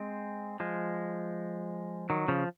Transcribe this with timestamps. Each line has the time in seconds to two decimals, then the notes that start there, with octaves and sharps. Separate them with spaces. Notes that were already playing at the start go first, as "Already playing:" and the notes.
Already playing: G#3 C4
0.60 F3 G#3
2.10 D#3 F#3
2.28 C#3 F3